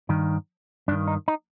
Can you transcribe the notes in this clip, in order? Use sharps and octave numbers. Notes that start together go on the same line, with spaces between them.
G2 D#3
G2 D#3 D4
D#4
D#4